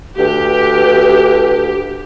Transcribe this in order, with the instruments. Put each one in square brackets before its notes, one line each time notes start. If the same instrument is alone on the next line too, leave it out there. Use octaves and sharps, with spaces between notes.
[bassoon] D2 [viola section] G4 [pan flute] B4